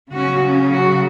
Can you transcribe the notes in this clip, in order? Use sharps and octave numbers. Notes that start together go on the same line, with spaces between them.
C#3 F#3 C#4 F#4
C#4
F#4